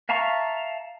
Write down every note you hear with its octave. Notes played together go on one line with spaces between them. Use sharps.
E5 F5 A5 A#5 C#6